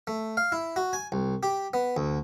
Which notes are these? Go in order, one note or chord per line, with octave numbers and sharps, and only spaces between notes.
A3
F5
E4
F#4
G#5
C2
G4
B3
D2